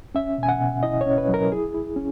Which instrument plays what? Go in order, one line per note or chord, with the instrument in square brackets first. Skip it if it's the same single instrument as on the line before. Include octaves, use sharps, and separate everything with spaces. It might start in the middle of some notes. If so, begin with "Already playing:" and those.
[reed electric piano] C#4 E5
B2 G#5
F#5
B2
E4 D#5
C#5
C#4
B4
F#3
A#4
E4 G#4
E4
C#4